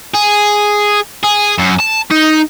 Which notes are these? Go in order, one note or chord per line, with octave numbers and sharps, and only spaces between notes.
G#4
G#4
F#2
A5
D#4